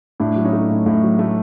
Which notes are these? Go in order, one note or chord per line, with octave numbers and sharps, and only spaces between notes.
A2 D4 E4
F#3
C#4 D#4
A3
A2
A2
F#3
A3